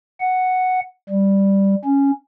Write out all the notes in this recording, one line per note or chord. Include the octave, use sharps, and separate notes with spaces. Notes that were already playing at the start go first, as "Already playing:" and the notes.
F#5
G3
C#4